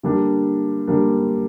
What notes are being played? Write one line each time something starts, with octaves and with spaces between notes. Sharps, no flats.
D3 G3 A#3 D4
D3 G3 A#3 D4